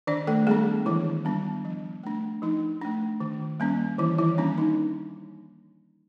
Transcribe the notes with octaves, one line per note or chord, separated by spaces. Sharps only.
D#3 D4 D5
A3 A4
G3 G#3 B3 D4 G#4
D#3 E3 E4
G3 B3 D4
F3
A3 D4
F3 D#4
A3 D4
D#3
G3 A#3 C#4
D#3 E3 E4
E3 E4
G3 A#3 C#4 D4
D#4